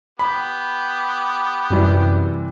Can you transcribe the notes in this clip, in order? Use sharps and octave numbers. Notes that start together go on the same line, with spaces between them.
B3 G4 B5
F#2 C3 E3 G3